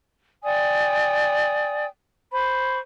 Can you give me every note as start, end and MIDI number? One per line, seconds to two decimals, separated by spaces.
0.44 1.86 74
0.44 1.86 79
0.44 1.86 80
0.44 1.86 87
2.33 2.80 72
2.33 2.80 83
2.33 2.80 85